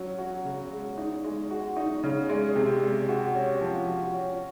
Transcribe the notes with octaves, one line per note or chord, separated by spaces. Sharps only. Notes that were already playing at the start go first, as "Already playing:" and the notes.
Already playing: F#3 C#4
F#4
C#3
G#3
D#4
G#3
F#4
D#4
C#3
G#3
C3
G#3
F#4
C#4
F3
F#4
C#4